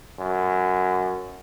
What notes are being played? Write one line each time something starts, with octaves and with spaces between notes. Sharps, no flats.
F#2